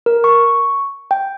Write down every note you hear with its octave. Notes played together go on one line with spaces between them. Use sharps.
A#4
C#6
G5